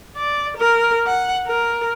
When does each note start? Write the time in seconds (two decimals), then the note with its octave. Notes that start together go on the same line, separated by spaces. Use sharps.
0.16 D5
0.57 A#4
1.07 F#5
1.47 A#4